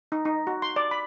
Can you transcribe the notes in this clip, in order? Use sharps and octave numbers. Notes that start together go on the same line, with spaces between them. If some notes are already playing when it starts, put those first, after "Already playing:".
D#4
D#4
F#4
C6
D5
B5